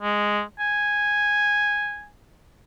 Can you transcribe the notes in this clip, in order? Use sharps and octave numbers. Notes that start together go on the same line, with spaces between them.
G#3
G#5